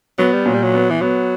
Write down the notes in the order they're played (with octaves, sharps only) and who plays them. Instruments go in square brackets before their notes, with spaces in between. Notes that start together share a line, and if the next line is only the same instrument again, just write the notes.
[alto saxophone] F#3 [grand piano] B3
[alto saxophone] G3
[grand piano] A#2 [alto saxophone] F#3
[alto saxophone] G3
F#3
[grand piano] B3
[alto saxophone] E3
[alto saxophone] F#3 [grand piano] B3